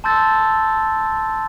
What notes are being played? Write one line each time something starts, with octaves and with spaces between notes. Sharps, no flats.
A5 C6 E6 G6 A6